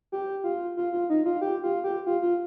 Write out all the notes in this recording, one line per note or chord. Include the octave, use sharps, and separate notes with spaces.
G4
F4
F4
F4
D#4
F4
G4
F4
G4
F4
F4